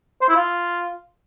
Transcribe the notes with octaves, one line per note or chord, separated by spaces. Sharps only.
C5
E4
F4